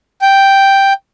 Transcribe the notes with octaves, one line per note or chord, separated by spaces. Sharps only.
G5